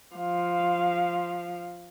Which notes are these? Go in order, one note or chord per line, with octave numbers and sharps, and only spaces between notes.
F3 F5